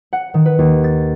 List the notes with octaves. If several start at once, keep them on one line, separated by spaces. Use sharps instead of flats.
F#5
D#3
B4
D#2
A6